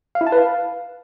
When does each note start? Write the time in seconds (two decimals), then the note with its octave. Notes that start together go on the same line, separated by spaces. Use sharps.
0.15 F5
0.21 E4
0.27 A5
0.32 B4
0.38 F5